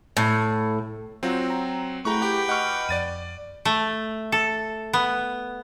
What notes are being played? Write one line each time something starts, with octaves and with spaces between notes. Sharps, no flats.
A2
F#3 C4 F4 F#5 A#5
A#5
A3 E4 F#4 G#4 B4 G5 A#5 C#6
G4
D#5 F#5 C#6 D6 F6
F2 D5 A6 D#7
A3
A4
B3